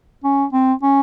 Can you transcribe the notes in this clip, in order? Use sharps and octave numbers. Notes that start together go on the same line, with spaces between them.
C#4
C4
C#4